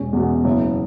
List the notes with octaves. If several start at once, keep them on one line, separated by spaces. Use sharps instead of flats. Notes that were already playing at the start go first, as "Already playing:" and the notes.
Already playing: E1 C#4
E2 B2
F#1